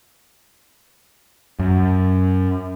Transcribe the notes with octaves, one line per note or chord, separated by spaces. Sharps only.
F#2